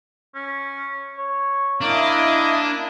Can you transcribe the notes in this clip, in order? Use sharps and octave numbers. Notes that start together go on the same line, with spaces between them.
C#4
C#5
A#3 D4 E4 D#5